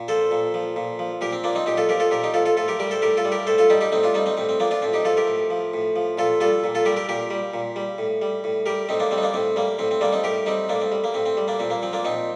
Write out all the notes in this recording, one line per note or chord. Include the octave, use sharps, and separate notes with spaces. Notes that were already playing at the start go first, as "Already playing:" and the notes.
Already playing: A#2
F3 A4 C5
A#2
F3
A#2
F3
A#2 G4 A#4
C4
F3 A#3 D4
C4 D#4
A#2 D#4 G4
F4 A4
F3 G4 A#4
F4 A4
A#2 G4 A#4
D#4 G4
F3 F4 A4
F4 A4
A2 F4 A4
G4 A#4
G3 G4 A#4
A4 C5
A2 G4 A#4
F4 A4
G3
G4 A#4
A2 A4 C5
F4 A4
G3 D#4 G4
D#4 G4
A2 C4 D#4
D4 F4
G3 C4 D#4
C4 D#4
A2 C4
C4
F3 A#3 D4
D4 F4
A2 C4
D#4 G4
F3 F4 A4
G4 A#4
A2
F3
A2
F3
A#2 F4 A4
G3 F4 A4
A#2
F4 A4
G3 G4 A#4
G4 A#4
A#2 G4 A#4
G3
A#2
G3
A2
G3
A2
G3 G4 A#4
A2 C4 D#4
A#3 D4
G3 C4
D#4
A#3 D4
A2 C4
G3 A#3
A2 C4
C4
G3 A#3 D4
C4 D#4
A2 G4 A#4
G3 C4 D#4
A2 A#3 D4
C4
G3
A#3
A2 C4
C4
G3
A#3 D4
A#2 C4
A#3
F3 C4
A#3 D4
A#2 C4 D#4